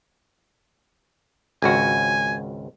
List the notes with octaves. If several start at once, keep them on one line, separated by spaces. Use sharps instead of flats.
G#1 C#2 F#4 G#5